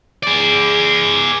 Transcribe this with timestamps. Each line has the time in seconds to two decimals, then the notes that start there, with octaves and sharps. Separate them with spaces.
0.23 G#4 D5